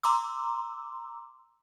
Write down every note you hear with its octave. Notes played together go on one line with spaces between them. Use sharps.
A#5 C6 D6 E6